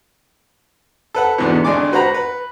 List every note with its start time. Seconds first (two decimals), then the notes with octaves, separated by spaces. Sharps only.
1.15 A4 B4 F#5
1.38 E2 G#2 B2 D3 E3 B3
1.64 G#1 D3 G#3 D5 G#5 D6
1.92 F#4 B4 C5 F#5 A#5 B5
2.14 B4